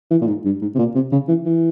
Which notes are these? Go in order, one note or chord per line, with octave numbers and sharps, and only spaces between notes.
E3
A#2
G#2
G2
G#2
C3
A#2
C3
C#3
E3
E3